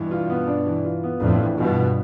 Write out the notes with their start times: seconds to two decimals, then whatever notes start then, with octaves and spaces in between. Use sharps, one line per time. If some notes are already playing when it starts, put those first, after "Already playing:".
Already playing: G2 B2 E3
0.11 F4
0.30 B3
0.48 D4
0.67 E3
0.85 F4
1.04 B3
1.21 F2 A2 D4
1.40 E3
1.58 G2 B2 F4
1.77 B3